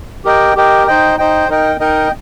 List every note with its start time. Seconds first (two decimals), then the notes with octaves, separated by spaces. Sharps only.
0.25 G4 A#4 D#5 G5
0.56 G4 A#4 D#5 G5
0.87 D#4 C5 D#5 G5
1.18 D#4 C5 D#5 G5
1.49 D#4 A#4 D#5 G5
1.80 D#4 A#4 D#5 G5